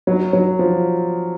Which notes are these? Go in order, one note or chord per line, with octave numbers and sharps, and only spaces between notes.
F#3
F#3
F3